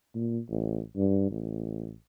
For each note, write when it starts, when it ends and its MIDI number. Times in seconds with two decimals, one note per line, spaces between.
0.15 0.39 46
0.50 0.80 33
0.96 1.28 43
1.31 1.92 33